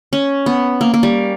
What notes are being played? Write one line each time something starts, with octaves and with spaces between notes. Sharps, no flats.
C#4
B3
A#3
A#3
G3